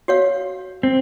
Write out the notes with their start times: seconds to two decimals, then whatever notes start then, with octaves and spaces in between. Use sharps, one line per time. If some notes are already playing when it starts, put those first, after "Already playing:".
0.08 F#4 C#5 F5
0.83 C4